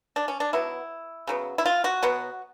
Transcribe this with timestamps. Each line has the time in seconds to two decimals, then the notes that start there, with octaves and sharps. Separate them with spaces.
0.16 D4
0.28 C#4
0.40 D4
0.53 B2 F#3 B3 E4
1.27 C#3 F#3 B3
1.58 E4
1.66 F4
1.84 F#4
2.03 B2 F#3 B3